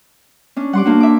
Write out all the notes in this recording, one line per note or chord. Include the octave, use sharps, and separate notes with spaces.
C#4 D4
G3 F#5 C6 D6
A#3 D4 F#4
E5 D6